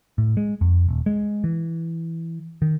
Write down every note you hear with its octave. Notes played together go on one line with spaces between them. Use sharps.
A2
G#3
F2
D#1
G#3
E3
D#3